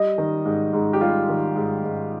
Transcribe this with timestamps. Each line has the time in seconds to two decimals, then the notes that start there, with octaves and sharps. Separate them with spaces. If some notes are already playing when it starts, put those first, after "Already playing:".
Already playing: G3 D#5
0.18 D#3
0.45 G#2
0.73 G#2
0.93 G4
1.01 G3 F4
1.29 D#3
1.56 G#2
1.84 G#2